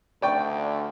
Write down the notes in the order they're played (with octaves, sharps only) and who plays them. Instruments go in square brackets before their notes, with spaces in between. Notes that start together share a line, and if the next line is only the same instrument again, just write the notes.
[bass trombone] D2 [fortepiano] D5 G5 C#6